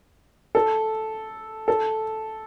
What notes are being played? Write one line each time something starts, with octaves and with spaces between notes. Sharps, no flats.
A4
A4